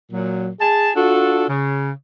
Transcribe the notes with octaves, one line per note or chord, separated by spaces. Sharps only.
A#2 F#3
G#4 A5
D4 F4 F#4 A4
C#3